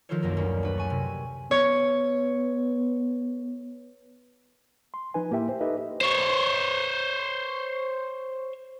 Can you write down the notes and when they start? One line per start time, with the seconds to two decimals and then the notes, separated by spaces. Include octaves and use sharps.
0.09 D#3 F3 F4 A4 C5 C#5
0.22 B1 F#2 A#3 A#4
0.37 D2 C#4
0.63 D4 B4
0.75 G#5 C#6 A6
0.90 C3
1.51 B3 C#5
4.94 C6
5.14 F3 D#4 B4 G#5
5.31 A2 A#3 E4 G4 E5 G5
5.49 C5
5.61 D#4 G4 A4 B4 D#5 E5
6.01 C5 C#5